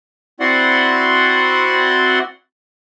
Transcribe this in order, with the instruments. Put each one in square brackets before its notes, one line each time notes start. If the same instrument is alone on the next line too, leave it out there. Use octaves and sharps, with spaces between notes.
[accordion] C4 E4 F#4 D5 F#5 C6